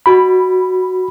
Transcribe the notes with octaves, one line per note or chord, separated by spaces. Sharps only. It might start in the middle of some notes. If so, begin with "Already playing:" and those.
F#4 B5